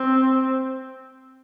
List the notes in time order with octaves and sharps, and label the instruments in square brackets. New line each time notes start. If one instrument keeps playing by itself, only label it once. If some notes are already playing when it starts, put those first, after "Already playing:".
Already playing: [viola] C4